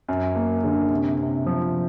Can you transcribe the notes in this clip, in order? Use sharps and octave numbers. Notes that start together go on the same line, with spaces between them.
F#2
A#3
D3
C3
C3
F3